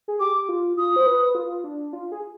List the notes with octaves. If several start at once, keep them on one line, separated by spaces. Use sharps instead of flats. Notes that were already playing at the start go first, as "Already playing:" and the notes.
G#4
G4 D6
F4
F4 D#6
C5
B4
F4
D4
F4
G#4